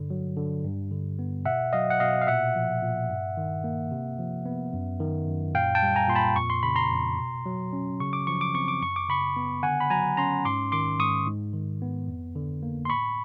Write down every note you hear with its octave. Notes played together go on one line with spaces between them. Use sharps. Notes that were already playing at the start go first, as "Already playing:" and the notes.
Already playing: G2 D3
F#3
D3
G2
D3
B3
B2 E5 F#5
F#3 D#5 F5
F#5
B2 D#5 F5
F5
A#2 E5 F#5
F3
A#2
G2
D#3
A#3
C3
F3
B3
F#2
D#3
F#2
A#2 F5 G5
G5 A5
G3
G#5 A#5
A#2 C6
A5 B5
F2 C#6
C6
C#3 B5
A#5 C6
F2
B2
F#3
C#4
C#3 C#6
D6
F3 C#6
D6
C4 C#6
D6
F#2 C#6
D6
C#3 B5 C#6
B3
D3 F#5 G#5
B5
F#3 G#5 A#5
C#4 A#5 C6
G#2 C6 D6
D#3 C6 D6
G#2 C#6 D#6
G#2
D#3
B3
F2
D3
A#3
C6
A2 B5 C#6